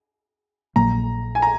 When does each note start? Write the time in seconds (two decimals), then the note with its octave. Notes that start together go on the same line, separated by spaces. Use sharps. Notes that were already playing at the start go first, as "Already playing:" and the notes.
0.76 A#1 A#2 F#3 A#3 A#5
1.35 G#5
1.42 A#5